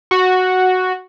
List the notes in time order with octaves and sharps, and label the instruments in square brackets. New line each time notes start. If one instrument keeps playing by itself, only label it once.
[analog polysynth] F#4